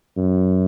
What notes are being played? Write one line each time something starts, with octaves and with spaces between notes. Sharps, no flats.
F#2